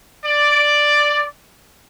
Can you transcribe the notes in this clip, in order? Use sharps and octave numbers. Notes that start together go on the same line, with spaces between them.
D5